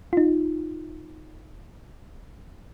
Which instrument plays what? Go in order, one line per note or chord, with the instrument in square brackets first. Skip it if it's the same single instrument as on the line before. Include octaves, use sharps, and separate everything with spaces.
[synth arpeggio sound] D#4 F4